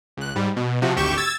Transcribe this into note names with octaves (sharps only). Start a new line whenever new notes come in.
C#2 F#6
G#2 G3
B2
C3 F3 F#4
G#1 D2 G4 C#6 G6 E7
E6 G#6 A6